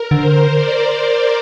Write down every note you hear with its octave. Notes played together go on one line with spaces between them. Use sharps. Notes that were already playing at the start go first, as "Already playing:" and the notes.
Already playing: A#4
D3 C5
D5